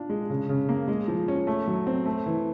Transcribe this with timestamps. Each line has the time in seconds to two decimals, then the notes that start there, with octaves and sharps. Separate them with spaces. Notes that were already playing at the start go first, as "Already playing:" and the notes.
Already playing: D4 F4
0.10 G#3
0.30 C#3
0.49 C#3
0.69 A#3
0.88 G#3
1.08 F3
1.28 C#4
1.47 A3
1.67 F#3
1.87 C4
2.05 A3
2.26 E3